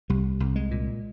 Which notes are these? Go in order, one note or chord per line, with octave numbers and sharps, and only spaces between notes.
C2 G3
C2
G#3
A#2